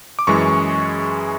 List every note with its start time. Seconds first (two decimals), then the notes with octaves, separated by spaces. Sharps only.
0.19 D6
0.27 F#2 E3 G#3 C#6